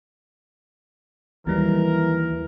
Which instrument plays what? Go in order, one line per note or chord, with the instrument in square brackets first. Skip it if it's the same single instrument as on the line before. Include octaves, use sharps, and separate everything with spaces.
[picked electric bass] D#2 [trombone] E3 [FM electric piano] F#3 G3 [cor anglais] A#4